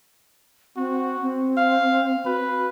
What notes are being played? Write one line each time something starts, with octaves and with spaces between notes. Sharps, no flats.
C4 F#4
C4
F5
F#4 B4